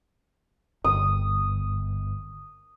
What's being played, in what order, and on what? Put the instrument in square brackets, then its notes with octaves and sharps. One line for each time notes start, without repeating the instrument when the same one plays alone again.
[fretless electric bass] G1 [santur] D#6